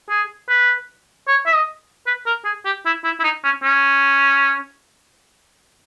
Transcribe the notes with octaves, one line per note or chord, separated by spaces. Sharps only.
G#4
B4
C#5
E5
D#5
B4
A#4
G#4
G4
E4
E4
E4
D#4
C#4
C#4